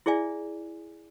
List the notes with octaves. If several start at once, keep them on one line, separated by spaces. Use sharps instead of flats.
E4 G#4 D5 E5 G#5